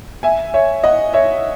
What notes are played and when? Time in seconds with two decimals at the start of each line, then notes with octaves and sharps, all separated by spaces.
0.23 E5 G#5
0.54 C#5 E5
0.83 D#5 F#5
1.13 C#5 E5